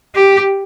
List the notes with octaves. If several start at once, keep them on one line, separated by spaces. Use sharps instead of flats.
G4